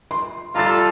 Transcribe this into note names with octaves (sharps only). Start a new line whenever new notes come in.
C6
G3 F4 A4 A#5 A6